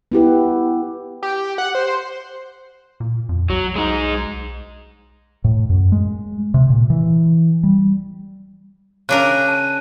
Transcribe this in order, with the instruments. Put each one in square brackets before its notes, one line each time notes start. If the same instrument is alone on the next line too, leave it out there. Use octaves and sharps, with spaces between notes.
[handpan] B3 E4 G4 B4
[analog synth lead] G4
F#5
C5
[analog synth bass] A#2
F2
[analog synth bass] B1 [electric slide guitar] F#3
[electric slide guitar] G#3 D#4
[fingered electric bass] A2
F#2
G#3
C3
A#2
E3
G3
[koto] C#3 D4 A#4 [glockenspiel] F#6 D#7
[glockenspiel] A5